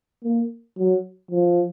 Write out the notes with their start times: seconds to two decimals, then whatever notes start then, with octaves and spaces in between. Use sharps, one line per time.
0.24 A#3
0.78 F#3
1.31 F3